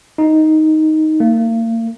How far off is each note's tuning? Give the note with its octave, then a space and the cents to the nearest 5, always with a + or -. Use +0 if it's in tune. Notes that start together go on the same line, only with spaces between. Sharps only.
D#4 +5
A#3 -40